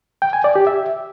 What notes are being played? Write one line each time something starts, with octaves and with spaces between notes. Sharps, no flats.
G5
G#5
D5
G4
E5